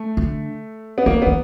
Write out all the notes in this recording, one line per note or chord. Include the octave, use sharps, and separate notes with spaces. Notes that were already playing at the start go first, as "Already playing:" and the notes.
Already playing: A3
D3
B3
D#3 A#3
D#3 B3